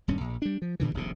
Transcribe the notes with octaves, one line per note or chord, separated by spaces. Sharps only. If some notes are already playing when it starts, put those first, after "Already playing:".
D#1 G2 C#4
A#1
G3 D4
F3
G2 A#2 D3 E3
D#1 A#1 D#2 C3